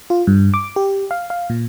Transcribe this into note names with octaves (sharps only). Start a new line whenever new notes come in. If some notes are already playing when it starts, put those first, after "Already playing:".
F4
G2
D6
G4
F5
F5
A#2